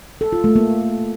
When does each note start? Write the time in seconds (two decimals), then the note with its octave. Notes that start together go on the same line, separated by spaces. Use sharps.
0.21 A4
0.33 F4
0.44 A3
0.56 A#3